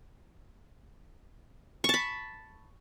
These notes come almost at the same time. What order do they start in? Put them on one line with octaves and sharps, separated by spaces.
C#6 A5 B5